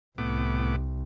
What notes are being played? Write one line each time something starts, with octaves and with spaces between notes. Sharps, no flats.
C2 A2 B3 D6